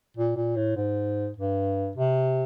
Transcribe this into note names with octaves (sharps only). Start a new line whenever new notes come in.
A#2
A#2
A2
G#2
G2
C3